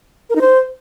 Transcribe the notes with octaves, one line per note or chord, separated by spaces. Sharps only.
A#4
D#4
C5